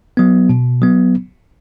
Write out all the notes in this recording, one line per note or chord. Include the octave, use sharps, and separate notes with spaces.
F#3 B3
B2
F#3 B3